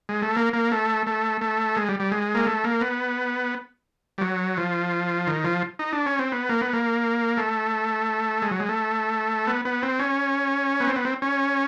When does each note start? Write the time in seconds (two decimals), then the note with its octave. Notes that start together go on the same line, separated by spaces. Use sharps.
0.09 G#3
0.22 A3
0.37 A#3
0.53 A#3
0.72 A3
1.07 A3
1.41 A3
1.76 G#3
1.89 G3
2.00 G3
2.12 G#3
2.35 A#3
2.47 A3
2.64 A#3
2.81 B3
4.18 G3
4.21 F#3
4.57 F3
5.27 D#3
5.44 F3
5.79 D#4
5.93 D4
6.06 C#4
6.19 C4
6.32 B3
6.49 A#3
6.62 B3
6.73 A#3
7.37 A3
8.42 G#3
8.51 F#3
8.60 G#3
8.69 A3
9.47 B3
9.65 B3
9.83 C4
9.99 C#4
10.80 B3
10.87 C4
10.96 B3
11.05 C4
11.22 C#4